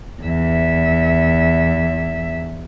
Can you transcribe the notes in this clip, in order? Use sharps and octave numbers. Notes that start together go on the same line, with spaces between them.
E2 E5